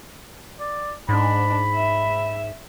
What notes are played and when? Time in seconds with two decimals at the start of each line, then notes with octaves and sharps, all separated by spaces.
0.60 D5
1.09 G#2 D4 B5
1.75 E5